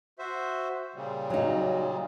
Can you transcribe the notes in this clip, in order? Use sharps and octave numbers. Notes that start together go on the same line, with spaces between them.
F#4 C5 E5
A#2 C#3 G3
F#3 D#4